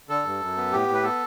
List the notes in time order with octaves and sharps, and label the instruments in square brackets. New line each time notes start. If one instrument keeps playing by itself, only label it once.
[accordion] D3 A4
G2
F#2
B3
A2 G4
A2
B4
B3 A4